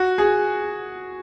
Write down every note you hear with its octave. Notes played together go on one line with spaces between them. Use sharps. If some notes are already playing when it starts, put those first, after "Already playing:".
Already playing: F#4
G#4